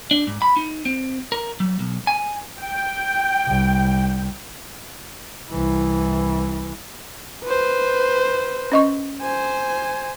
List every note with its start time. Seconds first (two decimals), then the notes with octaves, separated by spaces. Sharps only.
0.11 D4
0.27 G#2
0.42 B5
0.56 D#4
0.85 C4
1.32 A#4
1.60 F#3
1.79 B1
2.07 G#5
2.61 G5
3.46 C2
5.50 C2 E3
7.44 B4 C5
8.72 C#4 D#5 C#6
9.21 C5 G#5